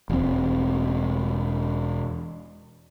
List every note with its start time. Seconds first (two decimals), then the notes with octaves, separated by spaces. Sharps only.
0.10 E1 C4